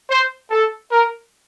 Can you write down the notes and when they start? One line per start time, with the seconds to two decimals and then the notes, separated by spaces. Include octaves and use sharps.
0.10 C5
0.51 A4
0.92 A#4